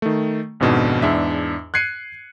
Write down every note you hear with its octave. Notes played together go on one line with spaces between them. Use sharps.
D#3 A3
G#1 F2 G#2 B2 D4
E2 G#2 D4 E5
F#6 G#6 C7 C#7 D#7